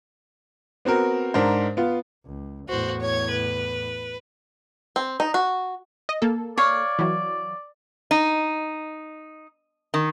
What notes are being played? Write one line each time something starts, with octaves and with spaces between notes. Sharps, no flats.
B3 C4 F#4 A#4
G#2 D4 A#4 C5
B3 F4
C#2
E2 A2 F#4 C5
C#5 G#6
B4
C4
D#4
F#4
D#5
A#3 A4
C#5 D5 F5
E3 F#3
D#4
D#3